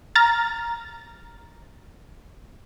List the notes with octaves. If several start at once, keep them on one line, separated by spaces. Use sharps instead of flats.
A#5 F6 A6